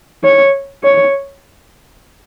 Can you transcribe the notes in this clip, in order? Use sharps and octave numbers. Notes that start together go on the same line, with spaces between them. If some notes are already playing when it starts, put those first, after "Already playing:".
C#5
C#5